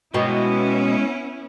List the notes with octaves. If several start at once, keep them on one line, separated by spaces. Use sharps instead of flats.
B2 G#3 B3 C#4 E4 D#5 G5